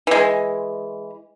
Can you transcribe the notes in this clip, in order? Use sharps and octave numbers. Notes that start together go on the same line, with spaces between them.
E3 G#3